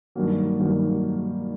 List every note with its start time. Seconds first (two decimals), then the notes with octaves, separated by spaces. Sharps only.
0.15 G2 D#3 F#3 A#3
0.59 G2 D#3 F#3 A#3